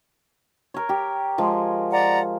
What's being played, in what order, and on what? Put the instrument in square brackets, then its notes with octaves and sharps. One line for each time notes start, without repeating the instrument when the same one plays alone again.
[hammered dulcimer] A#4 C#5
G4
F3 G#3
[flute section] D5 F#5 A#5